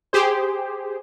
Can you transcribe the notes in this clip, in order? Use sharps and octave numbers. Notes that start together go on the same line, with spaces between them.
G4 G#4 C5